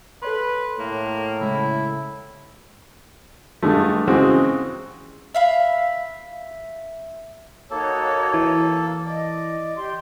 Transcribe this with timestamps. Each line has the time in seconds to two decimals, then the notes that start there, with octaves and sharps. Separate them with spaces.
0.22 A4 B4 C#5 C6
0.79 A2 A#3
1.41 C#3 G#3 E4
3.63 G2 D3 G#3 A3
4.08 C#3 E3 G#3 C4 F#4
5.34 E5 F5 B5
7.71 A#3 D#4 F#4 A4 C#5
8.34 E3
9.05 D5 D#5
9.76 G4 C6